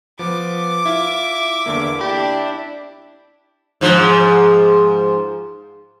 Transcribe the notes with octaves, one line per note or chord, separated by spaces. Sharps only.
F3 B3 D6
E4 F4 E5
E2 D3 A#3
D4 E4 G4 B5
G#2 F3